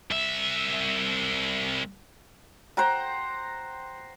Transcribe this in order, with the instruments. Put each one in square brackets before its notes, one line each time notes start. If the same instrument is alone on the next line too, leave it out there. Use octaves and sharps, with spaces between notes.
[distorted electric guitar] C2 E5
[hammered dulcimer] C5 F#5 G5 A#5